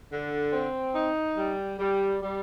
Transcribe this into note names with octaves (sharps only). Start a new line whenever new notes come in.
D3
C4
D#4
G3
G3
G3